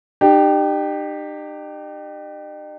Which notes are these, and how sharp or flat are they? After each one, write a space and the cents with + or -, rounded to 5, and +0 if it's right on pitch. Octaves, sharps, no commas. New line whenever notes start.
D#4 -45 G4 +0